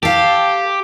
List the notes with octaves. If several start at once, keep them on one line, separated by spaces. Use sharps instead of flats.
G4 A4 F5